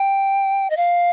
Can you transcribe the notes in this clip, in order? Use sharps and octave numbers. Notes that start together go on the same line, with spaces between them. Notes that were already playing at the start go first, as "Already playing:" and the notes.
Already playing: G5
D#5
F5